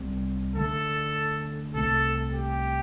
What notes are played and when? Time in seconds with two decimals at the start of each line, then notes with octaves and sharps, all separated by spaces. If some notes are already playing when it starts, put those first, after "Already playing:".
Already playing: C2 C3 G3 C4
0.56 D2 D3 A3 A4
1.75 C2 C3 A3 A4
2.34 G4